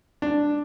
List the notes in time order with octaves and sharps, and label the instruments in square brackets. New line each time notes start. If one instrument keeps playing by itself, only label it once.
[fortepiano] D4